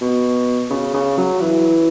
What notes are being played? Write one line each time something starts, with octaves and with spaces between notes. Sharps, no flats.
B2
C#3
C#3
F#3
E3